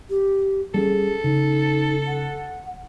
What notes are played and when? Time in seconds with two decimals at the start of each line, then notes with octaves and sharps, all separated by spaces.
0.10 G4
0.74 G3 C4 C#4 G#4 A4
1.24 C#3 D#4
2.08 F#5